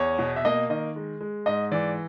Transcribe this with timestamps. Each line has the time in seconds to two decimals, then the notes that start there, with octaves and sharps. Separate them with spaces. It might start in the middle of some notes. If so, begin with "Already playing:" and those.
Already playing: E2 C#5
0.19 B2
0.36 E5
0.45 A#3 D#5
0.69 D#3 D#5
0.96 G#3
1.21 G#3
1.46 G#2 D#5
1.72 E3 D5